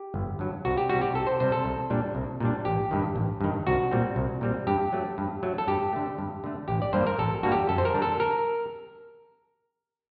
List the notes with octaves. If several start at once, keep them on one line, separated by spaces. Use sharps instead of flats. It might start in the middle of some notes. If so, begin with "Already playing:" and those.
Already playing: G4
G1
G2 F#3
C2 F#4
G4
C3 G3 F#4
G4
C2 A4
C5
C3 G3 C5
A4
C2
A#2 G3 D4
C2
A#2 G3 D4
A1 G4
G2 D#3
A1
G2 D#3
C2 F#4
A#2 G3 C4
C2
A#2 G3 C4
G2 G4
F#3 A3
G2
F#3 A3
A4
G2 G4
D3 A3
G2
D3 A3
A1 G4
D5
G2 D3 G3 A#3 C5
A#4
A1 A4
G2 D3 G3 A#3 F#4
G4
F#2 A4
C5
A#4
D3 G3 D4
A4
A#4